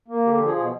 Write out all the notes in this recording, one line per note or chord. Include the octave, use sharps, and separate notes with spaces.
A#3
D3 G4
G4
F3
G#4
B2 G#4